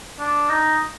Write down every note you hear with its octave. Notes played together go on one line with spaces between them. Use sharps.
D4
D#4